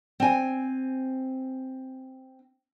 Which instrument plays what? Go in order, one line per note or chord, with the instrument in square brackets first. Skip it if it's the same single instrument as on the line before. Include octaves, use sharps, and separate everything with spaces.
[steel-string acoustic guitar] C4 G#5